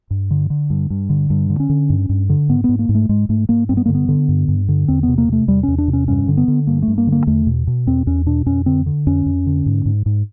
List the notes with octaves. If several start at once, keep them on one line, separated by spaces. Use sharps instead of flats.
G2
D3
D3
G2
G2
D3
G2
D3
C#4
D3
G2
G2
D3
G#2 B3
G#2 B3
A#3
G#2
A3
G#2 G#3
G#2 A3
G#2 A#3
G2 C4
B3
D3 A#3
B3
D3
G2
G2
D3
E2 C4
B3
C3
A#3
C3 A3
E2 G3
E2 C#4
D4
C3
C#4
G2 C#4
D3
B3
D3
G2 A#3
A3
G2
A#3
D3
A#3
E2 A3
B2
B2
E2 C4
E2 C#4
B2 D4
F2 C#4
D3 C4
D3
F2 C#4
F2
D3
G#2
G#2
G#2